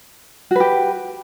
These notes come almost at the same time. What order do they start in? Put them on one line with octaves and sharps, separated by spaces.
F#4 B4 G4